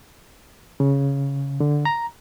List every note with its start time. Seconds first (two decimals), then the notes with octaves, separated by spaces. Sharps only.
0.80 C#3
1.60 D3
1.85 A#5